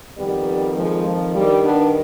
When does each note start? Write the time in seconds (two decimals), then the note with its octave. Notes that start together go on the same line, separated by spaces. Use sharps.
0.17 F2 D#3 G3 B3
0.76 F3 G#3
1.05 F3
1.34 G2 D#3 G3
1.64 B3 D4